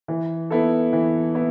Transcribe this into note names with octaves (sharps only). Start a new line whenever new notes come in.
E3
B3 E4 A4
E3
B3 E4